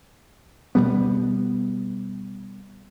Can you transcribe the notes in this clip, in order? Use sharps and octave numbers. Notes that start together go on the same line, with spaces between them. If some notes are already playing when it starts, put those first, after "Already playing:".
B2 G3 B3